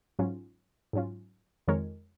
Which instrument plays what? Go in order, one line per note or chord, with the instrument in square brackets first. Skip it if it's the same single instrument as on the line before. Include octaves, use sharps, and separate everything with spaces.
[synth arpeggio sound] G#2 F#3 C#4 F4
G#2 F#3 C#4 F4
F2 D#3 G#3 A#4 C#5